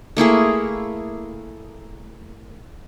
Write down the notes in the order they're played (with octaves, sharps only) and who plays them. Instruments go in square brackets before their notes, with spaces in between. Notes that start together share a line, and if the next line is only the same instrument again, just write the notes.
[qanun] A3 A#3 E4 G#4